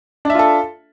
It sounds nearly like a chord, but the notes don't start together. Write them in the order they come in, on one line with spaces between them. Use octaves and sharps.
D4 E5 F4 A4